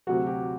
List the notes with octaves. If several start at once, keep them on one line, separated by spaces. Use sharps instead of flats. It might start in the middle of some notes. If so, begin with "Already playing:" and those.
D2 C3 F#3 F#4
G4